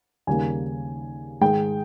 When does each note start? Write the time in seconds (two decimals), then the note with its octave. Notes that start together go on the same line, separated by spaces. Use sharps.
0.27 D#2 C#3 G3 A#3 G#5
1.41 G#2 D#3 G#3 G5